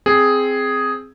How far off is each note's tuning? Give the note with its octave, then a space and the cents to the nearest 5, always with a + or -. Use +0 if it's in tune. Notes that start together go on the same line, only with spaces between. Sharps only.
C4 +0 G#4 +0